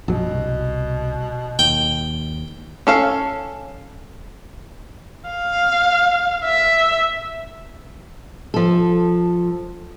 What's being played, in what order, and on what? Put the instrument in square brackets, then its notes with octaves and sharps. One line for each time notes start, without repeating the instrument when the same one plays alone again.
[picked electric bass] A#1 F#2 F#3 [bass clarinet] B2
[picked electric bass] C2
[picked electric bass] D#2 [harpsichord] G5
[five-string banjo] C#4 A4 F5
[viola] F5
E5
[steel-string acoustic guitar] F3 A4